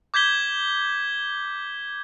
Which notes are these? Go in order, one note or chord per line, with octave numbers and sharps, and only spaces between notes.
D6 G6 G#6 B6 G7